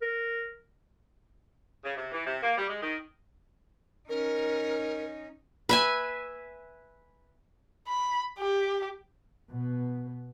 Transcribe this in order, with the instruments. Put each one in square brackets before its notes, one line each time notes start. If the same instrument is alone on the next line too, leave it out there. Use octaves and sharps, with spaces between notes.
[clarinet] A#4
[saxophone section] C#3
C3
E3
C3
A#3
G3
G#3
D#3
[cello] C#4 D#4 [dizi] A#4
[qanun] B4 E5 G#5
[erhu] B5
G4
[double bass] B2 B3